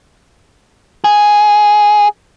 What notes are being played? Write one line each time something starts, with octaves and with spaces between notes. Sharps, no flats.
G#4